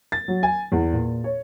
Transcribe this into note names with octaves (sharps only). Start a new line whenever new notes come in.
A6
F#3
G#5
E2
A#2
C#5